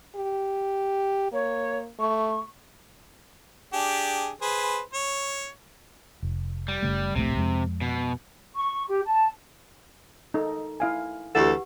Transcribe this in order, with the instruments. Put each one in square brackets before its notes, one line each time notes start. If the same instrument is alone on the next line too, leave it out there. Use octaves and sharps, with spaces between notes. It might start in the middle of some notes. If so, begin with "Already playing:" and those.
[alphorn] G4
[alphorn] A#3 [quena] C#5
[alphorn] A3 [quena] C#6
[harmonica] D4 G4 G#4
G#4 B4 C5
C#5
[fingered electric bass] F1
[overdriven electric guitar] G3
[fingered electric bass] F#1 C#3 A3
[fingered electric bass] D1 A#1 A3 [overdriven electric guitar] C3
[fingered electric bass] F2 G#3
[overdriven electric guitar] B2
[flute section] C#6
G4
A5
[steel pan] D#4 A4
E4 F5 G#5
[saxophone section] D2 E3 A4 [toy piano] G4 B4 F#5